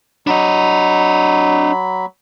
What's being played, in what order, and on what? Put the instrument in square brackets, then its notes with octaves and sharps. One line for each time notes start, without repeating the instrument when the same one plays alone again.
[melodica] F#3 B5 [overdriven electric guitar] D4 D#5